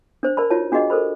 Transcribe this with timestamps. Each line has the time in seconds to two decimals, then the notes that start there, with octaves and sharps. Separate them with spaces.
0.23 D4 C5
0.37 A#4 D5 A5 B5
0.50 D#4 F4 F#4 C#5 A5
0.72 D4 F#4 G#4 D#5 F#5
0.90 A4 A#4 C5 B5